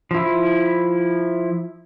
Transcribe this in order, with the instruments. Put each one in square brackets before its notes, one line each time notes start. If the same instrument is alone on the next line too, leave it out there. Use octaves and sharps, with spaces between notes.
[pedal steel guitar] F3 E4